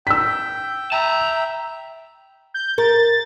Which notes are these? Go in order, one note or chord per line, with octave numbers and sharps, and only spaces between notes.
G5 E6 B6
E5 G5 A5 A#5
G6
A#4 A6